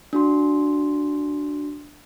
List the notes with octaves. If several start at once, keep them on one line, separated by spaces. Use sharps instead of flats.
D4 F#4 C6